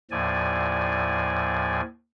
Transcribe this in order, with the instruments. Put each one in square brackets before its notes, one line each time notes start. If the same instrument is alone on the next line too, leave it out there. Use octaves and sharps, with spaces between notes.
[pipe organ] D#2 A2 F3 D5 G#5